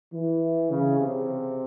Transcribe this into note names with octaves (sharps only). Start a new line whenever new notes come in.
E3
C#3
C3